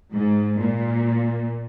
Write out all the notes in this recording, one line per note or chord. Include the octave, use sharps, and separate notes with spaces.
G#2
A#2